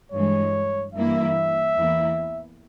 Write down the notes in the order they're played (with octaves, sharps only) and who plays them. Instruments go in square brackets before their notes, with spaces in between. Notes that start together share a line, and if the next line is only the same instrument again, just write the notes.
[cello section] G2 E3 G#3 [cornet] C#5
[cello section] G2 E3 A#3 E4 [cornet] E5
[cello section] E2 E3 A#3 E4